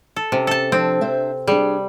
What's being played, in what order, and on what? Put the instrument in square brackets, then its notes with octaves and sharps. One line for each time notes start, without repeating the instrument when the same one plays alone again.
[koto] A4
[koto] C3 [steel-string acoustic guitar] C#4
[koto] A4 A5
[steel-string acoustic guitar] F3 D4 A5 [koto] C4
[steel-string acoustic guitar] D4 C5 E5
[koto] G3 [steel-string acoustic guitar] D4 G#4